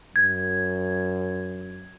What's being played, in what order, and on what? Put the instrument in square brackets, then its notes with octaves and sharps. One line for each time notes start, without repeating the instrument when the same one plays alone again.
[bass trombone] F#2 [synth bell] G#6